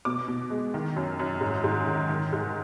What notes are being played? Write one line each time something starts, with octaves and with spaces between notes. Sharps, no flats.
B2 D6
B2
G#3
D#3
F#2
F#2
G#2
G#2
D#3
D#3
G#2